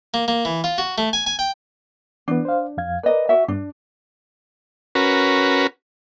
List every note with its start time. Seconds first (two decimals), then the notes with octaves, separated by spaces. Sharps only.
0.14 A#3
0.28 A#3
0.45 E3
0.64 F4
0.78 F#4
0.98 A3
1.13 G#5
1.26 G#5
1.39 G5
2.28 E3 B3 D4
2.45 C5 F5
2.77 F2 F5 G#6
3.03 A#4 B4 D5 D#5
3.29 F#4 E5
3.48 G2 D4
4.95 C#4 F#4 A#4 B4